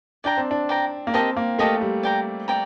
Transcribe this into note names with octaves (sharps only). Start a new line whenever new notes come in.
D4 D5 G5 A#5
C4
D4
D5 G5 A#5
A#3
C4 G4 A#4 D#5 A5
A#3
A3 G4 A#4 D#5 A5
G3
D5 G5 A#5
D5 G5 A#5